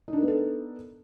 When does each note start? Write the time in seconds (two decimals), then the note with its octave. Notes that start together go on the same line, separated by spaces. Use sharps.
0.08 D#4
0.13 D4
0.18 A#4
0.23 B3
0.28 A4